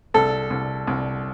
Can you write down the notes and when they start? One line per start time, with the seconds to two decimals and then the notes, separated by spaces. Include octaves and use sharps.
0.14 C2 A4
0.50 C2
0.87 C2